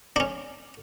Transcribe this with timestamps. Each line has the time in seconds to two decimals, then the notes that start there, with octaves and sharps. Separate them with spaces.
0.16 C#4 D4